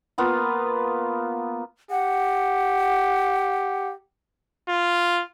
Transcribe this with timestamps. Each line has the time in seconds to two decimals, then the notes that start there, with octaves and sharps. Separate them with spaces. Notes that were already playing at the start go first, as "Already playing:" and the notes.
0.18 A#3 B3 F4
1.91 G4 F#5
4.69 F4